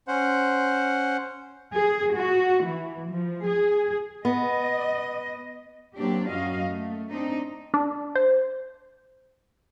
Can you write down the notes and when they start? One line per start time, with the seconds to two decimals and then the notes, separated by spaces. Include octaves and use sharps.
0.08 C#4 C5 F#5
1.74 G#4
2.15 F#4
2.66 E3
3.11 F3
3.49 G#4
4.25 B3 D#5
5.97 F#3 A#3 C4 D4 G4
6.29 F#2 F#3 F#4 D#5 F5
6.68 A3
7.09 C4 D4 D#4
7.74 D4
8.15 C5